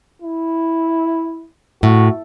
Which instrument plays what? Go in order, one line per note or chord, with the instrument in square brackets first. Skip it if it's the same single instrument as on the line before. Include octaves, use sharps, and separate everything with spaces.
[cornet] E4
[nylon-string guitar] A2 [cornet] F#4